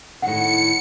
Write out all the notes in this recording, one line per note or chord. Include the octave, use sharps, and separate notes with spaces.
A2 D#3 F#5 C#7